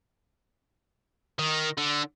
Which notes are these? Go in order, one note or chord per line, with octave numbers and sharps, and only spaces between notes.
D#3
D3